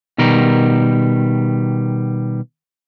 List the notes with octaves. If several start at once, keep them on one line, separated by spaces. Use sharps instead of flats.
B2 D#3 G3 A#4